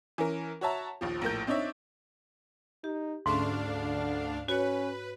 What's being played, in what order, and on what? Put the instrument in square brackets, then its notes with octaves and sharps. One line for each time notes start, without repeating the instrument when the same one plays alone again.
[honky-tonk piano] E3 C#4 A#4
F#4 C#5 E5 A5 A#5
A#1 D#2 F3
A#1 A2 A#4 G6
C4 D4 D#4 C#5 E5
[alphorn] D#4 [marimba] G4
[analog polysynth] D2 D4 F5 [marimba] G#2 C#4 [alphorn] A3
[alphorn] D3
[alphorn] C#4 [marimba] F#4 C#5 [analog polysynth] B4